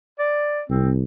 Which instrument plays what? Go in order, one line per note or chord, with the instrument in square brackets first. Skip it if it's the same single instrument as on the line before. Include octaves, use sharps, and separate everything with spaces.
[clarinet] D5
[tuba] C2 [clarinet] C4